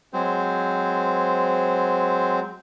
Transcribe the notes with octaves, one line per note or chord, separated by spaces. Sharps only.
F#3 G#3 C4 C5